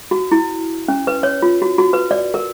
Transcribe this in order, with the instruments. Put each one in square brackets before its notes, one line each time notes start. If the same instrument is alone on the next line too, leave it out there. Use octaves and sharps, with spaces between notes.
[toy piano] F#4
E4
C#4
B4
C#5
F4
F#4
F#4
B4
D5
A#4